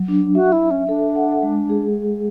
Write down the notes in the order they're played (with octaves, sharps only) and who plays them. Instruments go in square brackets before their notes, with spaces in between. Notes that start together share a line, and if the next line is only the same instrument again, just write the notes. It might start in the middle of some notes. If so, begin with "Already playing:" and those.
Already playing: [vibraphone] F#3
D4
[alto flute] F#4 [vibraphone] E5
[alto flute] E4
[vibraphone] E5
[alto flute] C#4
[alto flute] D4 [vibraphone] A4
[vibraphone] F#5
G#3
G#4